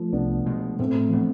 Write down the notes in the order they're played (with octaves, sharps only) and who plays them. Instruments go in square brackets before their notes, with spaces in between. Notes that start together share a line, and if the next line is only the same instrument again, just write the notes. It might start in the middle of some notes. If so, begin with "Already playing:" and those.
Already playing: [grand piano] F3 A3
[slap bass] C2 [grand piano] B3 D4
[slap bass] B2 G#3
[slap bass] A2 [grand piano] A3 C4
[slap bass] F3 B3 D4